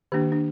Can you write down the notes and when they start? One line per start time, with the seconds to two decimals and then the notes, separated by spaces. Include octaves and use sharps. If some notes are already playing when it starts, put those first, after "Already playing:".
0.12 D#3 A#3 D4 G4
0.32 D4